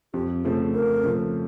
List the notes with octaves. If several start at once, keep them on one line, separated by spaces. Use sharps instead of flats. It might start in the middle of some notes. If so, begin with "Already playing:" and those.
F2 G4
C#3 F3 A3 G#4
F2 A#4
C#3 F3 A3